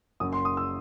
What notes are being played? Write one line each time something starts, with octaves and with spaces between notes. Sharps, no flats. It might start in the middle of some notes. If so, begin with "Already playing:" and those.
F#1 F#2 F#3 D#6
C6
D#6
E6